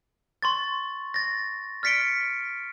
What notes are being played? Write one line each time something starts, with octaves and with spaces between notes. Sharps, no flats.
C6 C#6 A6
A6 A#6
F6 A6 B6 C#7 D7 G7